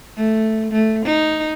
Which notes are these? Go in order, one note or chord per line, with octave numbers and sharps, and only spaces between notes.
A3
A3
D#4